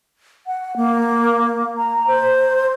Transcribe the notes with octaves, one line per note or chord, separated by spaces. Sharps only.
F#5
A#3
A#5
C5